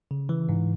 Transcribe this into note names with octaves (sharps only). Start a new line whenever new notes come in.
C#3
E3
G#2